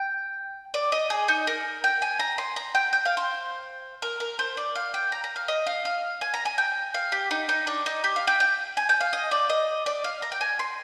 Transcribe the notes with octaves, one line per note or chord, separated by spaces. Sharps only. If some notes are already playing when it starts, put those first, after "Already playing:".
Already playing: G5
D5
D#5
G#4
D#4
A#4
G5
G#5
A#5
C6
A#5
G5
G5
F5
C5
A#4
A#4
C5
D5
F5
G5
A#5
A#5
F5
D#5
F5
F5
G#5
A#5
G#5
G5
F5
G4
D#4
D#4
D4
D#4
G4
F5
G5
G5
G#5
G5
F5
D#5
D5
D#5
D5
F5
A#5
G5
G#5
C6